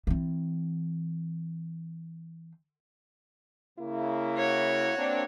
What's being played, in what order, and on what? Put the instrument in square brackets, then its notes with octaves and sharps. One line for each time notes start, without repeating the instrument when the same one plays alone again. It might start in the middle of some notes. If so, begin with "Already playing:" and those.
[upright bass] E3 C4
[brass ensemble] C#3 A#3 E4
[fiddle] F#4 C#5
[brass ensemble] A#3 C4 D4